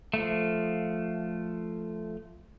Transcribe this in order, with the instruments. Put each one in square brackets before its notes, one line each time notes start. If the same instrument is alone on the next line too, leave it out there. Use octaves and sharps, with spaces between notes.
[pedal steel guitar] F3 A3